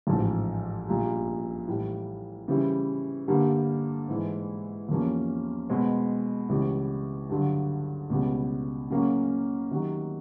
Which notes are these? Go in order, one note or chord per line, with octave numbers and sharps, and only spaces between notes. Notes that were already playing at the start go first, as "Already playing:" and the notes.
A1 G#2 F3
A#1 A#2 G3
A2 E3 G3
C#3 E3 G3 C4 E4
G2 D3 G3 A#3
G#2 E3 G#3
E2 C3 F3 A#3 C#4
B2 G#3 C4
C#2 C3 E3 G3
G2 D3 F#3
C#2 B2 G3
C#3 F#3 A#3 C#4 F#4
C3 D#3 F#3